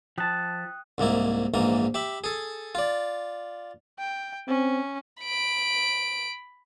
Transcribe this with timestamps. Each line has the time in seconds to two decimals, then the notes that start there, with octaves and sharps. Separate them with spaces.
0.18 F3 G5 A5 D#6 F#6
0.98 C2 G#2 A#3 E4
1.54 A#1 G#2 E3 A#3 A#5
1.94 G4 E5 B5
2.24 G#4 A4
2.75 F4 D5
3.99 G5
4.48 C4 C#4
5.21 B5 D7